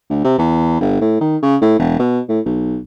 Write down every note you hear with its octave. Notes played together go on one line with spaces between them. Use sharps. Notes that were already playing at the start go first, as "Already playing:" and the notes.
D2
C3
E2
G1
A2
D#3
C#3
A2
E1
B2
A2
B1